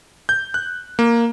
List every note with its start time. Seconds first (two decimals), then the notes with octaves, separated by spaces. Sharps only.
0.29 G6
0.54 F#6
0.99 A#3